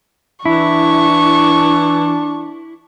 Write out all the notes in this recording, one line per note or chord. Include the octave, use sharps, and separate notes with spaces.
E3 D4 E4 C#6